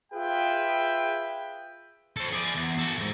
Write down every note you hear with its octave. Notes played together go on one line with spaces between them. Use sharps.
F4 G#4 B4 E5 G5
A4 C5
G#4 D5
E2
F#4 A4
F2 G#2